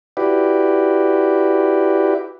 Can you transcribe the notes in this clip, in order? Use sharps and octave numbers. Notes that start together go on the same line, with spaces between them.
E4 F#4 G4 B4 D5